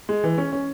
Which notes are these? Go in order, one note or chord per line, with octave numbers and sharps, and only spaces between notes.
G#3
E3
C#4
C#4